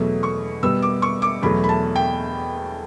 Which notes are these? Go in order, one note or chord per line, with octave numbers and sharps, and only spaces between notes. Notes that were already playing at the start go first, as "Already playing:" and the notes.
Already playing: E2 B2 F#3 A3
C#6
B2 G3 B3 E6
D6
C#6
D6
E2 B2 F#3 A3 B5
B5
A5
G5